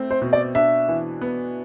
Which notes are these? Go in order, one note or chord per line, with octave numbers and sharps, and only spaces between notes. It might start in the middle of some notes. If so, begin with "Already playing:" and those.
Already playing: A3 C4 E4
C5
B2
D5
D4 E5
E3
B3